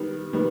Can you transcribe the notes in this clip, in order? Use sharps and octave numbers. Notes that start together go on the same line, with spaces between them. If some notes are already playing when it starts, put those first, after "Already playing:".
Already playing: D#3 G3 B3
D#3 G3 B3